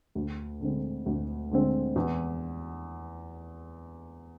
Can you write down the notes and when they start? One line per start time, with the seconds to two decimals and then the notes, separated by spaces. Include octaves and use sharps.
0.15 D2
0.60 D3 G#3 C4
1.06 D2
1.51 D3 G#3 C4
1.96 E2